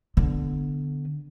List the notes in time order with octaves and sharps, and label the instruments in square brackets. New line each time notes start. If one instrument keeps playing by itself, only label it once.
[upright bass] D3 B3